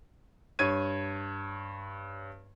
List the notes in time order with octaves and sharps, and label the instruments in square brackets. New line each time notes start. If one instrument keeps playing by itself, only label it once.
[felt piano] G2 C#5 G#6 D#7